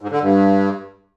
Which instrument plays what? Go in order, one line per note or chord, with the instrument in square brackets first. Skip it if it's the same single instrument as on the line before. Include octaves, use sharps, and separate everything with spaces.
[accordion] G#2
D3
G2